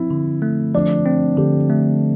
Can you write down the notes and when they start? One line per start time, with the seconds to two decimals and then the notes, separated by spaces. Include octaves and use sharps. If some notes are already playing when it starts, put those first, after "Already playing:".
Already playing: F3 C4 E4
0.11 D3
0.42 A3
0.75 F3 D4
1.06 C4
1.38 D3 G4
1.70 A3